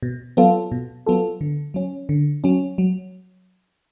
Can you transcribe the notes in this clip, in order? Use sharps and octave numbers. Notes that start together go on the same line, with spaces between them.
B2
F#3 B3 F4 A4
B2
F#3 B3 F4 A4
D3
F#3 C#4
D3
F#3 C#4
F#3